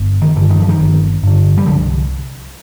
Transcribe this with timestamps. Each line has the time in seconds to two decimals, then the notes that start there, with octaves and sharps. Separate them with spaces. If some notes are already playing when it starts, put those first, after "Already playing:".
Already playing: G1
0.22 D#3
0.36 G2 D3
0.50 D#3
0.60 F3
0.69 D#3
0.79 G1
1.23 G2 D3
1.58 G3
1.66 C2 D3 F3